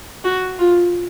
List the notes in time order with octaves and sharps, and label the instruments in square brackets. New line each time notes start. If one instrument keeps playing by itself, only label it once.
[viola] F#4
F4